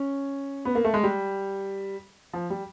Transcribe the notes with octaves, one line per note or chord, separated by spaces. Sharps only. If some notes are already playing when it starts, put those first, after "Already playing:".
Already playing: C#4
B3
A#3
A3
G#3
G3
F3
G3